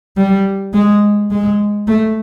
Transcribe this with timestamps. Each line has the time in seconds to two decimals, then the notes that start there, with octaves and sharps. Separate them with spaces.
0.17 G3
0.74 G#3
1.31 G#3
1.87 A3